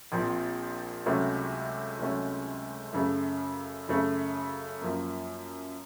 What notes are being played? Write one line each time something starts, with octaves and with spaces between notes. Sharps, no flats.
A#1 A#2 F3 C4
C#2 C3 F#3 A3 C#4
C#2 C3 F#3 A3 C#4
F#2 C#3 A3
F#2 C#3 A3
F#2 F3 A#3